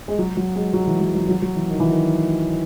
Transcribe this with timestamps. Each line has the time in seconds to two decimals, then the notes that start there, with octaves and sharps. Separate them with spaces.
0.08 G#3
0.19 F#3
0.37 F#3
0.55 G#3
0.73 F#3
0.87 E3
1.01 F#3
1.15 F#3
1.28 F#3
1.42 F#3
1.56 E3
1.70 D#3
1.80 E3
1.91 D#3